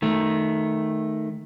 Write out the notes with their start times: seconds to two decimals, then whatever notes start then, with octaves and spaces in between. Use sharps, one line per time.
0.02 D#3 A3